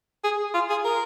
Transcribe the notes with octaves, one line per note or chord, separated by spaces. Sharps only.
G#4
F4
G#4
A#4